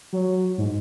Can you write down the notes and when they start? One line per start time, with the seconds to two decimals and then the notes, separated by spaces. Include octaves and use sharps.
0.13 F#3
0.58 G#2